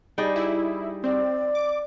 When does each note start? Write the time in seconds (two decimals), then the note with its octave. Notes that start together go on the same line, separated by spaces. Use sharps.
0.18 G3 D#4 G#4
0.36 E4
1.04 C4 D5
1.55 D6